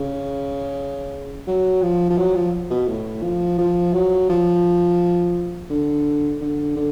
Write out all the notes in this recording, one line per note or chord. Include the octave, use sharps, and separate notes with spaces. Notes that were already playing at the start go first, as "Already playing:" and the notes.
Already playing: C#3
F#3
F3
F3
F#3
F3
B2
A2
F3
F3
F#3
F3
D3
D3
D3